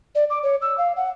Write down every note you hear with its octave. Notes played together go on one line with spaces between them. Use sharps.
D5
D6
C#5
E6
F5
F#5